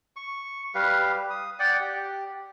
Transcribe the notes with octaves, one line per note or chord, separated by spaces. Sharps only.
C#6
G3 G4 B4 F5
D#6
D5 F#5 G5
G4